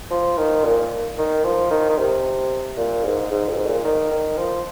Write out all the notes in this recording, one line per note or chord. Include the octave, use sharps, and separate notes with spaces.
F3
D#3
A#2
D#3
F3
D#3
D#3
C3
A#2
G#2
G#2
F2
G#2
A#2
D#3
D#3
F3